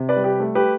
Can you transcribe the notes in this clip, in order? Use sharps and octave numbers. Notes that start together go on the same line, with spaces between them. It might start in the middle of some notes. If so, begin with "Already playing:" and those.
Already playing: C3
B4 D5
G3
G4 B4
A3
G4 B4